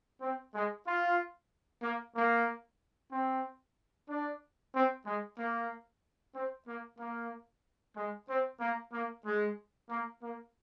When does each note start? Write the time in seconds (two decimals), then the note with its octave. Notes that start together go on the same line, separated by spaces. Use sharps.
0.21 C4
0.54 G#3
0.87 F4
1.83 A#3
2.16 A#3
3.12 C4
4.09 D4
4.74 C4
5.06 G#3
5.38 A#3
6.35 C4
6.67 A#3
6.99 A#3
7.97 G#3
8.29 C4
8.60 A#3
8.93 A#3
9.25 G#3
9.90 A#3
10.22 A#3